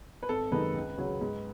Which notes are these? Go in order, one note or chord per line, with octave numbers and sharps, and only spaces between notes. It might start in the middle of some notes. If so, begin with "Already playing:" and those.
B4
G#1 A4
F#2 D#3 G#3 D#4 B4
C#2
C#3 F#3 C#4
G#2